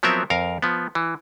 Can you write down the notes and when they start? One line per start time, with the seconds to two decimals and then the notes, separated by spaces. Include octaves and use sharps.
0.03 F3 F#3 B3 C4 A#4 E5
0.30 F2 A#4 F5
0.62 F3 B3
0.95 E3